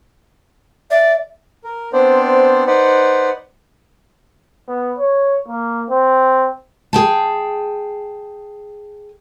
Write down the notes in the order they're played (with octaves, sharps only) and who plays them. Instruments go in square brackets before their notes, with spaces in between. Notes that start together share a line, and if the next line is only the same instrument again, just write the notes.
[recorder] D5 [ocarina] E5
[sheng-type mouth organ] A#4
B3 C4 D4 C5 D5
D#4 B4 C5 D5 F#5
[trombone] B3
C#5
A#3
C4
[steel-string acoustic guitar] G#4 G5 A5